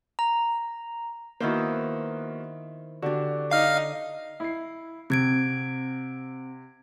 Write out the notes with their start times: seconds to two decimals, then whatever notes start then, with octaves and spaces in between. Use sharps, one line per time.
0.19 A#5
1.40 D#3 A#3 B3 E4 F#4 C5
3.02 D3 D4 F#4 G4
3.51 D#4 F5 F6
4.40 E4 C7
5.10 C3 C4 G#6 D7